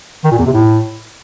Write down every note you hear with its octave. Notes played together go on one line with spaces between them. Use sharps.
D#3
A#2
E2
C3
A2